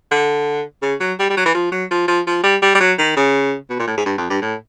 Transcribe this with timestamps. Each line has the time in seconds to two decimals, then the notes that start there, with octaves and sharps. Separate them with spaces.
0.11 D3
0.82 C#3
1.00 F#3
1.19 G3
1.30 G3
1.37 F#3
1.46 E3
1.55 F3
1.72 F#3
1.91 F3
2.08 F3
2.27 F3
2.44 G3
2.62 G3
2.75 G3
2.80 F#3
2.99 D#3
3.16 C#3
3.70 B2
3.79 A#2
3.87 A2
3.97 G#2
4.06 G2
4.18 F2
4.30 G2
4.42 A2